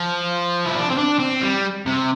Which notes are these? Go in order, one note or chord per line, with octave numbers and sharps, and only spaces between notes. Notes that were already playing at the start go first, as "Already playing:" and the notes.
Already playing: F3
E4
D4
C4
D4
C4
G3
C3